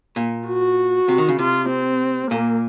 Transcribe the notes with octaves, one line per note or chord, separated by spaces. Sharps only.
A#2
F#4
C3
D#3
C#3
C3 F4
C4
A#2 A#3